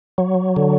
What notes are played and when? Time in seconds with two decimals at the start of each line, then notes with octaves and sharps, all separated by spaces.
0.18 F#3
0.56 D3